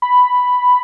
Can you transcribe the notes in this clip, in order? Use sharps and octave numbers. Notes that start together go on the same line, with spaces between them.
B5